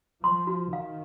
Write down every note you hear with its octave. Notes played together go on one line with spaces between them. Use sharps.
F3 C6
F#4
D#3 F5